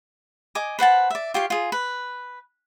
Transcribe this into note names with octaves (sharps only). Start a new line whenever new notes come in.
D#5 G#5 D6
B4 C5 F#5 A5
D5 E5
F4 G4 C#5 F5
F4 G#4
B4